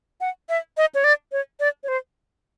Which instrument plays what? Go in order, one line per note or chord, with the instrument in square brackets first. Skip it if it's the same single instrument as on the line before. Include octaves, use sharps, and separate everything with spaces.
[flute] F#5
E5
D#5
C#5
D5
C#5
D5
C#5
C5